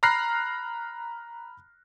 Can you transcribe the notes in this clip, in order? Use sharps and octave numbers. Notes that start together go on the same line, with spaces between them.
A#5 B5 F6 F#6 A#6 C7